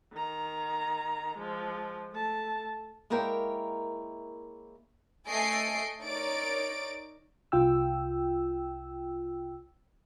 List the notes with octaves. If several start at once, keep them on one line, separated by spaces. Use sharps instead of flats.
D#3 A#5
F3 G#3
A3 A5
G#3 A#3 E4 A#4 C#5 G5
A3 A4 D#5 G#5 C7 D7
D#4 A#4 C#5 D5 A6 D7
C2 F4 G5 E6